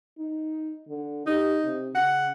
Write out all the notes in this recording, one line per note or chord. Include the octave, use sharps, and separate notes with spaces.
D#4
D3
D#4 G4
C3
C#3 F#5